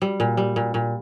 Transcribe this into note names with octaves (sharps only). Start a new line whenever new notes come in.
G3
A#2
G3
A#2
A#2